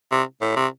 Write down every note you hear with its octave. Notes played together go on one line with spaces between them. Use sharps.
C3
A2
C3